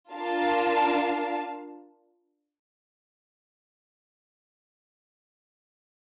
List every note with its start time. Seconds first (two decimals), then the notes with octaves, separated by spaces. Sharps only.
0.12 D4 F4 A#4 F5 A5